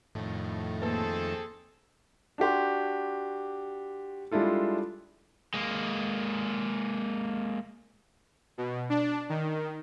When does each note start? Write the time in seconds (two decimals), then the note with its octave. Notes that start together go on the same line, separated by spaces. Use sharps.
0.15 F2 A2 D#3 A3
0.82 A#3 C4 G#4 A4 B4
2.38 D4 F#4 G4 C6
4.32 G3 G#3 D4 E4 F4 A4
5.54 G#3 A#3
8.58 B2
8.90 D4
9.29 D#3